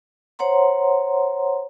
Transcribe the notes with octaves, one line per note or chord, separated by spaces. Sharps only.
C5 C#5 F#5 A#5 C6